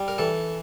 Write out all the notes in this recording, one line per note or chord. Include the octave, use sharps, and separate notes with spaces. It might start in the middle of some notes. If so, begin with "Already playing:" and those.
Already playing: G3
A#4
E3 A4